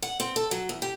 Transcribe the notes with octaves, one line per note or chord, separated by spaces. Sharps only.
F#5
C4
A4
F#3
E2
G4